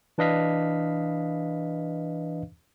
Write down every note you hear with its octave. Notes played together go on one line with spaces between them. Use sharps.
E3 D4 B4 D#5 F5 B6